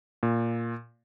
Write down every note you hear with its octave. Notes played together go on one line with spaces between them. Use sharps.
A#2